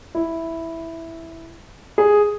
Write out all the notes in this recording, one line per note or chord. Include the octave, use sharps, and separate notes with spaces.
E4
G#4